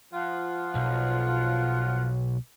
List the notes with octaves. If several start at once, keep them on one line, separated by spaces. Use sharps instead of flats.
F3 F4 F#5
B1